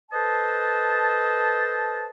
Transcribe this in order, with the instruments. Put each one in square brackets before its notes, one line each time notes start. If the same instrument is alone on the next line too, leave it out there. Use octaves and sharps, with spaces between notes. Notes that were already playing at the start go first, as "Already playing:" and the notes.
[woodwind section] A4 B4 C5 D#5 A5